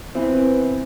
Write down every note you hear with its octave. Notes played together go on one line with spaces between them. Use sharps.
E3 B3 C4